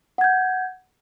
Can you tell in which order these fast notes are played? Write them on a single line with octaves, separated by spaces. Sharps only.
F#5 G#6 G6